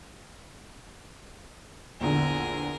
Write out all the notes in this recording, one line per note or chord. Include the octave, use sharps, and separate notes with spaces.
A#1 E2 D3 G#4 A#4